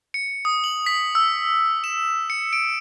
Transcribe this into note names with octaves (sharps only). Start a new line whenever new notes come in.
C#7
D#6
F#7
B6
E6
E7
C#7
D7